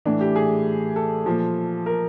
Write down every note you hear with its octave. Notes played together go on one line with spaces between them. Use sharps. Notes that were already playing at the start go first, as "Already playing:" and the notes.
A2 E3 D4
G4
G#4
A4
A#2 F3
A#4